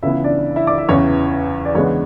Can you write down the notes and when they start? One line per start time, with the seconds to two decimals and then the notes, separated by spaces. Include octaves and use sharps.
0.03 C#2 C#3 E3 B3 E4 E5
0.24 D4 D5
0.56 E4 E5
0.67 D5 D6
0.78 E4 E5
0.89 E2 C#3 E3 C#4 C#5
1.65 D5
1.74 E2 C#3 G#3 B3 C#4 D4 C#5